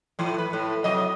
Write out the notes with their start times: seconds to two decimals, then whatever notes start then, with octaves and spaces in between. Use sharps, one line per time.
0.19 A2 E3
0.38 B4
0.53 A2
0.84 C3 F#3 D#5